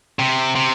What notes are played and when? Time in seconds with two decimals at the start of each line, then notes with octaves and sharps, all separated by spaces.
0.19 C3
0.56 C3